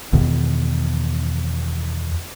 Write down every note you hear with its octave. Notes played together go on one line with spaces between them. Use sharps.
E2 B2 D#3